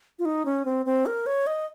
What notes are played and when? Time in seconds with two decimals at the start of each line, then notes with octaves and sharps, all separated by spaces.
0.19 F4
0.25 D#4
0.45 C#4
0.65 C4
0.86 C4
1.06 A#4
1.26 C#5
1.47 D#5